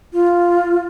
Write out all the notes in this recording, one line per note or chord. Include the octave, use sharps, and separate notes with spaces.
F4